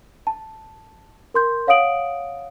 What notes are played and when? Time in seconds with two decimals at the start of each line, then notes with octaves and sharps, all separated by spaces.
0.27 A5
1.34 A#4 C6 G6
1.67 C#5 F5 F#5 D#6 D7 F#7